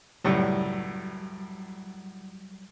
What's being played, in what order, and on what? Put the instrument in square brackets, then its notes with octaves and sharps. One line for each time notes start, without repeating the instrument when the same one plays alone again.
[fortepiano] C#2 F#2 A2 [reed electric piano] F#3 G3